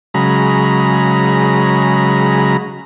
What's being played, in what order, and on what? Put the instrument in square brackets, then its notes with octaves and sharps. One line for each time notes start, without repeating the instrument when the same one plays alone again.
[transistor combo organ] C#3 F#3 G#3 A#5 B5